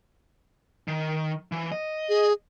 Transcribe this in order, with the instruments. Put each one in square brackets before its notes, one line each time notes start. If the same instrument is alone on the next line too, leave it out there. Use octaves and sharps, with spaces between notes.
[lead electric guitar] D#3
E3
D#5
[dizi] G#4